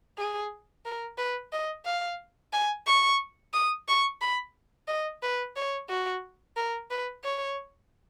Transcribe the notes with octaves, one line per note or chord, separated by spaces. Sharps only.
G#4
A#4
B4
D#5
F5
G#5
C#6
D#6
C#6
B5
D#5
B4
C#5
F#4
A#4
B4
C#5